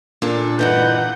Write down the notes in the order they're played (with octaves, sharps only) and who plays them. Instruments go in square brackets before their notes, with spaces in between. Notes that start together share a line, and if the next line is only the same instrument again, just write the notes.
[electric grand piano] A#2 [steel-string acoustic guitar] A#3 D4 A4
[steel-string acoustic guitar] G2 D3 E3 [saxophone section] D#4 B4 [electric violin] F#5 G6